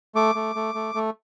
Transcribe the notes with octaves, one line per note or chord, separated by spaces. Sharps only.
A3 D6
A3
A3
A3
A3